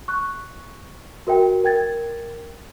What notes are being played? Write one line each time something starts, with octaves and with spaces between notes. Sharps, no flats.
C#6 F#6
F#4 A#4 E5 G5
A#4 G5 G#6 A6